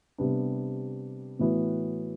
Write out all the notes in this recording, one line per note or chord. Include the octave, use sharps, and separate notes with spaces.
C3 G3 B3 D4
A2 E3 B3 F#4